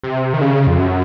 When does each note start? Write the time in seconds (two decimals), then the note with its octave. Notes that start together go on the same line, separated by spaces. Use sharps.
0.04 C3
0.33 D#3
0.41 C#3
0.67 F2
0.78 F#2